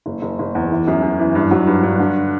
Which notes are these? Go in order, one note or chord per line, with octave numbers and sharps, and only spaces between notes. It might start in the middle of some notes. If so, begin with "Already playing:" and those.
F#1
F#1
F#1
E2
E3
F#2
F#2
E3
G2
F#3
G2
G2
D3